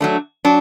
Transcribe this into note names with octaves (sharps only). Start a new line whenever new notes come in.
F#3 A3 D4
F#3 D4